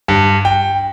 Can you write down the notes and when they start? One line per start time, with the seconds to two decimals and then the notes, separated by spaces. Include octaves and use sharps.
0.08 G2
0.45 G5